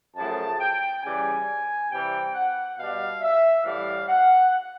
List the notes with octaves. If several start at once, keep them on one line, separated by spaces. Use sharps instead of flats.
F#2 C#3 F3 A3 A5
G5
C#3 E3 G3 G#5
C3 E3 G3 G5
F#5
B2 G3 F5
E5
A2 E3 G3 F5
F#5